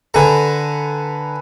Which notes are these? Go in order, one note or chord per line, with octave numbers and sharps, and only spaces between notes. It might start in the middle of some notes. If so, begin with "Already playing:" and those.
D3 A4 B4 G#5 A#5